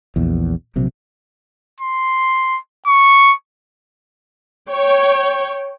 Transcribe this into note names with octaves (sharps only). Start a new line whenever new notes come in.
A#1 E2
A#1 C3 F#3
C6
C#6
C#5 G5